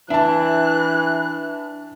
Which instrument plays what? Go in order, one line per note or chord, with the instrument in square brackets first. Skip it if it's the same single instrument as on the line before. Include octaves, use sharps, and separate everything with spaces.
[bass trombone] E3 [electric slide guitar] D4 [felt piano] E5 A5 [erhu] F#6